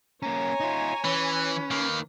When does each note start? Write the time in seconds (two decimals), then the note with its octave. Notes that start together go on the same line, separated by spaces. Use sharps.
0.22 A#3 C#4 C#5 G#5 A#5
0.60 D#4 F4
1.04 E3 C#4 B4
1.71 D#3 A#3 B4